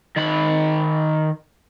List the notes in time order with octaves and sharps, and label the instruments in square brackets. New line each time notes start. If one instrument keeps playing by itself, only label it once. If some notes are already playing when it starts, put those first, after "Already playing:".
[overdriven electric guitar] D#3 B5